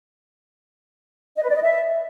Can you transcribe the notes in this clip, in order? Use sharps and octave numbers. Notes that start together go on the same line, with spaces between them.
D#5
B4
D5
D#5
E5